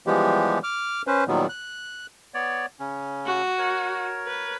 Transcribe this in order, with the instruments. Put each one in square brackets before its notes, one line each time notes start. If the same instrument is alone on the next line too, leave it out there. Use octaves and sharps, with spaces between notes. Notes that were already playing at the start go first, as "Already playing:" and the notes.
[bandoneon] E3 F3 G3 G#3 B3 G4
D6 F6
C#4 B4 C5
A#2 D#3 F#3 G3 B3
F#6
B3 C#5 D5
C#3 C#4
[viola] F#4
[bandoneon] A#4 C#5
[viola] B4